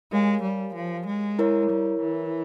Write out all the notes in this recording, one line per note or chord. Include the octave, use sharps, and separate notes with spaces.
G#3 G4 A#4 C#5 F5 G#5
G3
F3
G#3
E4 A#4 C#5
G3
E3